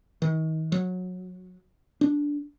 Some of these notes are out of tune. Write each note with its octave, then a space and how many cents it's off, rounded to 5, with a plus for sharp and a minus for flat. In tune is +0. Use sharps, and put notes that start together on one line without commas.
D#3 +35
F#3 -20
D4 -10